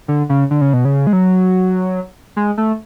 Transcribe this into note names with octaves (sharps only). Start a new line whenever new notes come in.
D3
C#3
D3
C#3
B2
C#3
G#3
F#3
G#3
A3